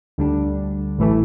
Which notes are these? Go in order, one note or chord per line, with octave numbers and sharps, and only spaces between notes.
D2 D3 G3 D4
A1 A2 E3 A3